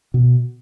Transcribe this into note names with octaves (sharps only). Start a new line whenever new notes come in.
B2